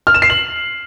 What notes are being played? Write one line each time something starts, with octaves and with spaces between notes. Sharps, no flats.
F6
E7
C7
F#7